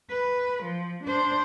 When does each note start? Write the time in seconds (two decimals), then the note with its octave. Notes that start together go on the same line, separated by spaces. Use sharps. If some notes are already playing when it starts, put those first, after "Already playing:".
0.10 B4
0.63 F3
1.04 D4 C5